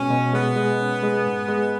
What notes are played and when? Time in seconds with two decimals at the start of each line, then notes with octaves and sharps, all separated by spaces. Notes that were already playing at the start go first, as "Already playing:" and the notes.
Already playing: B2 G#3 C#4
0.10 B2
0.33 G#3 B3
0.56 G#3
0.80 C#4
1.03 G#3
1.26 G#2
1.49 G#3